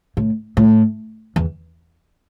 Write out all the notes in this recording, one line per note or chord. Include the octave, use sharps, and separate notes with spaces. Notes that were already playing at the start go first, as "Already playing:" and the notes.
A2
A2
E2